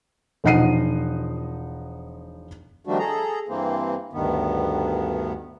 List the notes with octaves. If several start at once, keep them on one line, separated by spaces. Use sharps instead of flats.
E1 F3 D#4 F#5 C7 D#7
D#3 F3 G3 A3 D4 F#4
G#4 A4 A#5
G2 E3 A#3 C4
D2 G2 D#3 B3